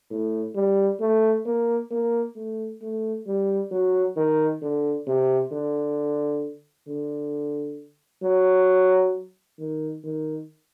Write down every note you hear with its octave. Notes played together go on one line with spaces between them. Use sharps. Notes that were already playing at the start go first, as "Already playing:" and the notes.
A2
G3
A3
A#3
A#3
A3
A3
G3
F#3
D#3
D3
C3
D3
D3
F#3
D#3
D#3